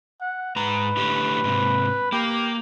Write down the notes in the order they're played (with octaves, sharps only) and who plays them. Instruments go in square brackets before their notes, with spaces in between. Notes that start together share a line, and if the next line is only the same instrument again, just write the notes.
[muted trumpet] F#5
[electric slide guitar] G#2 A#5 [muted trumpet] B4
[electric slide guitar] A2 D3 G4
G#2 C3
[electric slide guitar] A#3 [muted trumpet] G4